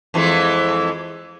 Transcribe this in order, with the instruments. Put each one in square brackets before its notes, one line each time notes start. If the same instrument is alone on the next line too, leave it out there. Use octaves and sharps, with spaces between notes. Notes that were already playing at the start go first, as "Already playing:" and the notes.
[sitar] F2 E3 G#3